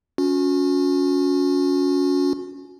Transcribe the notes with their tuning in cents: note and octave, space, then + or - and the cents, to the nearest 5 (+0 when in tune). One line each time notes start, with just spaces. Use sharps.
C#4 +25 F#4 -35